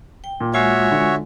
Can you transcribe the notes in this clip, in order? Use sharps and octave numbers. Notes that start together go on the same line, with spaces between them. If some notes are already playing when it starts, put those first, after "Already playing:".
G5
A#2
G#3 F4 F#4 C#5 E5 G#5
D3